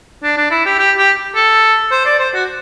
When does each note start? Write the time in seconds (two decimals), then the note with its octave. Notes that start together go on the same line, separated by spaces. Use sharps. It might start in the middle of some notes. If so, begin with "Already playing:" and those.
0.23 D4
0.37 D4
0.51 E4
0.65 G4
0.79 G4
0.97 G4
1.35 A4
1.91 C5
2.05 D5
2.19 C5
2.34 F#4